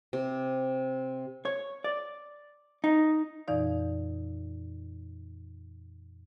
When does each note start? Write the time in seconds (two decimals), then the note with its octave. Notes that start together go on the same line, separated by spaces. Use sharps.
0.13 C3
1.45 C#5
1.84 D5
2.84 D#4
3.48 F2 A#2 E3 D#4 D5 F5